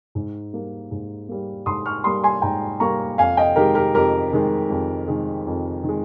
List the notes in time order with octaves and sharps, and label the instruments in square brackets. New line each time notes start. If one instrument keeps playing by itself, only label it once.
[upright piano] G#2
G3 A#3
G#2
G3 A#3
G#2 C6 D#6
C#6 F6
G3 A#3 C6 D#6
G#5 C6
G#2 G5 A#5
G3 A#3 A#5 C#6
F2 F5 G#5
D#5 G5
D#3 G#3 G4 A#4
G4 A#4
F2 G4 A#4
D#3 G#3
F2
D#3 G#3
F2
D#3 G#3